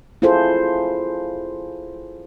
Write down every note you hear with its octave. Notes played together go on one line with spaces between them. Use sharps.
E4 F4 G#4 A4 C5